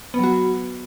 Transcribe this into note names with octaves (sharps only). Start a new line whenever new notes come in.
F#3 B3 F#4